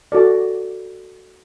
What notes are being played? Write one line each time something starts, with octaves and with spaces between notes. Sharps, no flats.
F#4 A4 D5